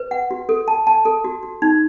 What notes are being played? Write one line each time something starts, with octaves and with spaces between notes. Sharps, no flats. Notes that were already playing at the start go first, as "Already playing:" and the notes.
Already playing: B4
F#5
F#4
A4
A5
A5
A4
F#4
F#4
D#4